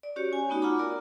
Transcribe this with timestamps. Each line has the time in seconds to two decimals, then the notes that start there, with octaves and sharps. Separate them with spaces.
0.03 D5
0.16 C#4 F#4 G4 C#5
0.32 C#4 G#5
0.49 A3 B3 D#4 F#4
0.62 F4 F#5 A#5 B5 D6
0.79 A#4 D5 A#5